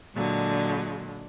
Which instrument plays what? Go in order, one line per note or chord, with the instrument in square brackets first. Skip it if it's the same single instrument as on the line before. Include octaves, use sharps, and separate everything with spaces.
[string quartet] A#2 D3 F#3 G#3